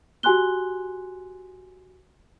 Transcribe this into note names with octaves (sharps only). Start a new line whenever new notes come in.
F#4 G4 G#5 C6 F#6 G7